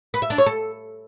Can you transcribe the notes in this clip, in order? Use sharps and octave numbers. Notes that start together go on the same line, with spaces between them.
B4
E5
D4
C#5
A4